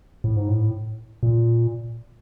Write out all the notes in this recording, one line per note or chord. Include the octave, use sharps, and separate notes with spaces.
A2
G#2
A2
A#2